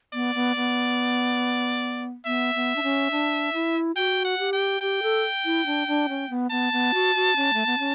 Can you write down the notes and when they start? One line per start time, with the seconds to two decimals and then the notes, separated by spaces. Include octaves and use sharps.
0.14 B3 D5
0.35 B3
0.56 B3
2.26 B3 E5
2.55 B3
2.76 D4
2.83 C#4
3.11 D4
3.54 E4
3.96 F#4 G5
4.25 F#5
4.39 G4
4.53 G5
4.81 G4 G5
5.03 A4
5.45 E4
5.66 D4
5.87 D4
6.09 C#4
6.30 B3
6.51 B3 A5
6.73 B3
6.94 F#4
7.16 F#4
7.36 C#4
7.54 A3
7.66 B3
7.79 C#4